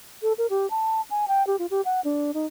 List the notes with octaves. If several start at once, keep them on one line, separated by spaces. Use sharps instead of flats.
A4
A#4
G4
A5
G#5
G5
G4
F4
G4
F#5
D4
D#4